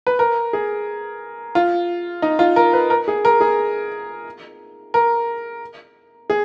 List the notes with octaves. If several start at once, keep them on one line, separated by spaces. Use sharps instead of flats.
B4
A#4
G#4
F4
D#4
F4
A#4
B4
A#4
G#4
A#4
G#4
A#4
G#4